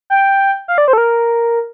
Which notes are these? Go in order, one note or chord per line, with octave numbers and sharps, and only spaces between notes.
G5
F5
D5
C5
A4
A#4